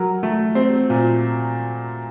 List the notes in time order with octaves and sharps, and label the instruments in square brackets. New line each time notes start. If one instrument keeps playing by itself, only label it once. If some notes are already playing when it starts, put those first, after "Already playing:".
Already playing: [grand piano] F#3 A#4
A3
C4
A#2